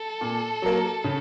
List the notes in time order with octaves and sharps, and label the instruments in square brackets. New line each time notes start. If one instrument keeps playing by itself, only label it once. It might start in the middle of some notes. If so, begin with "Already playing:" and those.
Already playing: [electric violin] A4
[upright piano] A#2
F#3 A#3
C#3